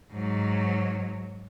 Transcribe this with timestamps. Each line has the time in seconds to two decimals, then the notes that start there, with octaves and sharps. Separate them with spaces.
0.12 G#2 F#3